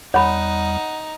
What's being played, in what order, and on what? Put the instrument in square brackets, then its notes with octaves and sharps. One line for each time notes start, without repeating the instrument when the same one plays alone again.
[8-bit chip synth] E2 G3 [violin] D#4 [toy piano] C#5 B5 [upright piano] F#5